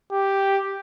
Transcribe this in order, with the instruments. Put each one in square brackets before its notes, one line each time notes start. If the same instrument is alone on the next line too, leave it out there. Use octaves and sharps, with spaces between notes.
[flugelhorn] G4